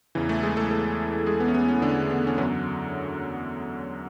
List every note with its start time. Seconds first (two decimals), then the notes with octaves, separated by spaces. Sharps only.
0.15 E2 C#3 E3
0.29 A3 A4
0.43 G#3 G#4
0.57 A3 A4
0.71 A3 A4
1.26 G#3 G#4
1.40 B3
1.48 C#4
1.55 B3
1.68 C#4
1.82 D3 D4
2.10 B3
2.27 C#4
2.38 F#2 D3 F#3 B3